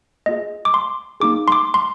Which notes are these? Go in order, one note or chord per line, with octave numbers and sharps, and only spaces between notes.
A#3 F4 G#4 D#5
D6
C6
A#3 D#4 G#4 D6
C6
D6
C6